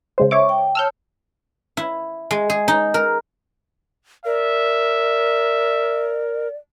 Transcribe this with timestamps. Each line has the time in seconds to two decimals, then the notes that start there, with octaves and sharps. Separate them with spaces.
0.18 C#3 G#3 C5
0.31 C#5 E5 C#6 D6
0.49 G5
0.75 C#5 A5 E6 F6 G6
1.77 E4
2.31 G#3
2.50 G#4
2.68 D#4
2.94 A#4
4.25 A#4 D5 E5